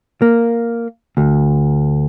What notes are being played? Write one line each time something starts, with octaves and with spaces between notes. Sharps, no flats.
A#3
D2